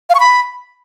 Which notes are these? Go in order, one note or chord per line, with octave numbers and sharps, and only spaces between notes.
F5
C#6
B5